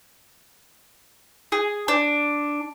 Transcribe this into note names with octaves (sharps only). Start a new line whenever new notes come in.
G#4
D4